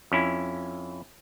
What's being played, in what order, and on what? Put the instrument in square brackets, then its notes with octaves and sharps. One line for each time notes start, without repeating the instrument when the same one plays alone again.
[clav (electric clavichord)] F2 C#4 E4